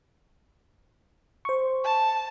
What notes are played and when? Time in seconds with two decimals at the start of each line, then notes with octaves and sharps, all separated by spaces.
1.45 C5 C#6
1.85 A5